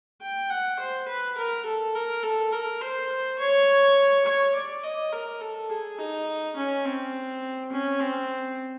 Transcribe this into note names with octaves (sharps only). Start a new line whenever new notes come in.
G5
F#5
C5
B4
A#4
A4
A#4
A4
A#4
C5
C#5
C#5
D5
D#5
A#4
A4
G#4
D#4
C#4
C4
C#4
C4